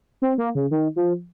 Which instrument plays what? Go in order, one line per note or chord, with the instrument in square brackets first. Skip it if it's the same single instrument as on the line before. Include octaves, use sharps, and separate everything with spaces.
[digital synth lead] C4
A#3
C#3
D#3
F3